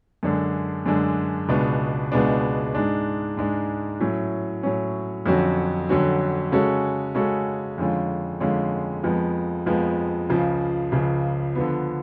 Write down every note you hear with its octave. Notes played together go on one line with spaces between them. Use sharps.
F#2 D3 G#3 D4
F#2 D3 G#3 D4
C#2 B2 G#3 B3 D4
C#2 B2 G#3 B3 D4
G#2 G#3 D4
G#2 G#3 D4
A2 F#3 C#4
A2 F#3 C#4
F2 D3 F#3 C#4 F#4
F2 D3 F#3 C#4 F#4
C#3 G#3 C#4 F#4 A4
C#3 G#3 C#4 F#4 A4
F2 D3 G#3 C#4 F4
F2 D3 G#3 C#4 F4
F2 F3 G#3 B3
F2 F3 G#3 B3
C#2 C#3 F3
C#2 C#3 F3
D3 F3 B3